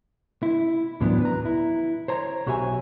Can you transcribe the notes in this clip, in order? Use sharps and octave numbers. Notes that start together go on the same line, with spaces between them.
E4
D2 A2 E3 F#3 B3 D4
B4 A#5
E4
C5 C#5 A#5
B1 F#4 G4 C#5 E5 G#5